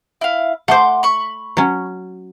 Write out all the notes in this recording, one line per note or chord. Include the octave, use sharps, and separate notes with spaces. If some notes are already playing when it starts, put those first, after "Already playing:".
E4 F5
A3 C5 F#5 C6 D6
B5 C#6
F#3 C#4